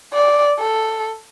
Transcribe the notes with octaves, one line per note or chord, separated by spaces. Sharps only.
D5
A4